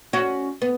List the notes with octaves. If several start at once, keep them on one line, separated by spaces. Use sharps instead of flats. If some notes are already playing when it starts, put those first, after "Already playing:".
C#4 F#4
B3